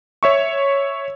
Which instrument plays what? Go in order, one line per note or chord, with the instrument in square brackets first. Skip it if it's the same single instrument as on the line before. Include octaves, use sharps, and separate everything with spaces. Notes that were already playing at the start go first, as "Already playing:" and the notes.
[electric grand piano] C#5 E5 C#6